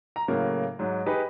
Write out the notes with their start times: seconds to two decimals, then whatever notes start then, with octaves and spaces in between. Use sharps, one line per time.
0.16 A#5
0.28 A2 C#3 F#3 A#3
0.79 G#2 F#3
1.06 D#4 G4 G#4 B4